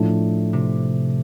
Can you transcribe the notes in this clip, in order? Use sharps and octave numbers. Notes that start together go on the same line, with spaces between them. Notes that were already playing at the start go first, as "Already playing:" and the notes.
Already playing: A2 F3 A3 D4
C3